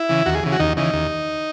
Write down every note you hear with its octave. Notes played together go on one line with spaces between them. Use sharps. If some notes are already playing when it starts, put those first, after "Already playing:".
Already playing: E4
C#3 E3
D#2 F#4
G#4
C#3 E3
F#4
D#2 D#4
C#3 E3 D#4
D#2